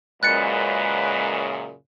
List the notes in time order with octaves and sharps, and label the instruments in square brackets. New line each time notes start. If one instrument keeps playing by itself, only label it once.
[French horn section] F#2 A#2 C#3 [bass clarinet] G#3 [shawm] B4 [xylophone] F#6 A6 C#7